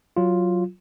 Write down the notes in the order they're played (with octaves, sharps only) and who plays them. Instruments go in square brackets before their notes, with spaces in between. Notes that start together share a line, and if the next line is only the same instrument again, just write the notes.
[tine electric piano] F#3 F4